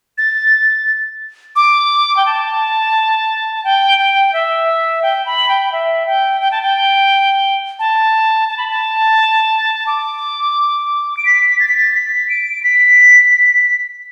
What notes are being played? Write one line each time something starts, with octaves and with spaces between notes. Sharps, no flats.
A6
D6
G5
A5
A5
G5
G5
E5
G5
B5
G5
E5
G5
G5
A5
G5
A5
A5
B5
A5
D6
D7
B6
A6
B6
A6
B6
D7
B6